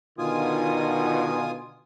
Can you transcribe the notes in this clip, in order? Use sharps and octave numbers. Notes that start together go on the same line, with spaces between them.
B2 D3 D#3 F4 G#5 D#6